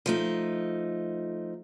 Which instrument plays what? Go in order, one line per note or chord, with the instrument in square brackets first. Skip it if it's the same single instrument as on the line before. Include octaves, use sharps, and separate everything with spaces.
[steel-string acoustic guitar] F3 A3 D#4